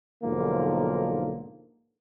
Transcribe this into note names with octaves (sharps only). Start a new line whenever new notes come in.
B1 G#2 D3 F3 A#3